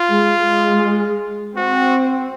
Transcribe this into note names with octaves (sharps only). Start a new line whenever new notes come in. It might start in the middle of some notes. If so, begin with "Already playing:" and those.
Already playing: F4
G#3
G#3
C4 F#4